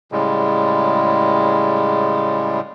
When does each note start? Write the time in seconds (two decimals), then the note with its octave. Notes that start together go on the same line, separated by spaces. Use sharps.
0.12 A2 C#3 G3 G#3